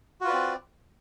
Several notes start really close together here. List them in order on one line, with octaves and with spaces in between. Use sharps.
F#4 F4 B4 D5 C4